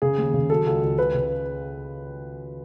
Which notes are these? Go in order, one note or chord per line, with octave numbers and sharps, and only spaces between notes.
C#3 G#4
D#2
C#3
F#3 A4
C#2
C#2
C#2 B4
C#3